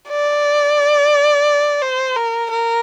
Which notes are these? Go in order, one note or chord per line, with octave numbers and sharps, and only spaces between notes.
D5
C5
A#4
A#4